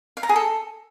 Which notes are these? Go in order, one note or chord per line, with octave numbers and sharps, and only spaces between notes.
F5
A#5
G#4
A4